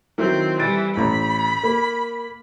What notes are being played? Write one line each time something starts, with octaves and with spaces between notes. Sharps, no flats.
D#3 F#3 C4 E4
E3 G3 A6 D7
A1 A#5 B5
A#3